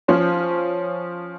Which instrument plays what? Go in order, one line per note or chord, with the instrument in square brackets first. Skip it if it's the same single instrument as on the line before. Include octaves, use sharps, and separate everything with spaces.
[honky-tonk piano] F3 C#4 C5